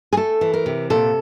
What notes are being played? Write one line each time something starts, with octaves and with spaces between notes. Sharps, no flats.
G#4
A3 A4
E3
A#4
C3
A#2 A4